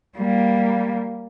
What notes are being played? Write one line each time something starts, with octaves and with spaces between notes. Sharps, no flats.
G3 A#3